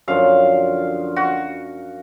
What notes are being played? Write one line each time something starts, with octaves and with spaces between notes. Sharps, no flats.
F#2 D3 F3 F5
F#4